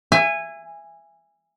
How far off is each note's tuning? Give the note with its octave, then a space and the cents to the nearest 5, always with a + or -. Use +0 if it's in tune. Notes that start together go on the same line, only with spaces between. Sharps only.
E5 +25 G#5 -15